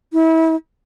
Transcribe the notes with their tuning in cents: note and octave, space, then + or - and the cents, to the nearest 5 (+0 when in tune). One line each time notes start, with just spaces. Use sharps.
E4 -30